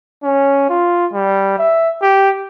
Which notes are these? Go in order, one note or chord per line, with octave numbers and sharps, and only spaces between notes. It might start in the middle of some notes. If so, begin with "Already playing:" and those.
C#4
F4
G3
E5
G4